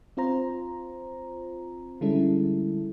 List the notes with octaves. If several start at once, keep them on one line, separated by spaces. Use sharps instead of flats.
C4 F4 C5 A#5
D3 G3 G#3 C#4 E4 A4